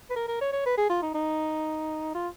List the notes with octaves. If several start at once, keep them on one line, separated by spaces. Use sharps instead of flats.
B4
A#4
A#4
C#5
C#5
B4
G#4
F4
D#4
D#4
F4